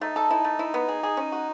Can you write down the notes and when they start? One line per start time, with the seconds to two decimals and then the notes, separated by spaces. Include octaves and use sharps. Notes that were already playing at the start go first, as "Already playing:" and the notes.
0.01 A3 D#4
0.16 A4
0.31 E4
0.44 A3
0.59 E4
0.74 B3
0.89 G#4
1.03 G#4
1.17 C#4
1.32 F#4